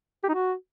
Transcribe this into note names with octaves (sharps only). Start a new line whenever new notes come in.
G4
D#4
F#4